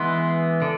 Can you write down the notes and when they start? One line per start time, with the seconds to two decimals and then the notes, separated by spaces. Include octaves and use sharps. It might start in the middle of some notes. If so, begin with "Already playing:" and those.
Already playing: E3 G#3 B3 C6
0.62 D3